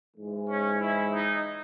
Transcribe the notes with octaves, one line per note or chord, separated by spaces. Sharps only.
G#2 E3 G#3
C#4
E4
D#4